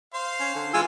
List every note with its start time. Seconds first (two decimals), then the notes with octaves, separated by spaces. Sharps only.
0.14 C5 F5 C6
0.40 C#4
0.55 D3
0.74 E3 G#3 F4 G#5 E6